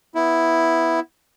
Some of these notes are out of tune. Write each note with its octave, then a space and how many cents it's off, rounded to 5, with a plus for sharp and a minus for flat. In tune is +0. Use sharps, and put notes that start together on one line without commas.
B3 +0 E4 +0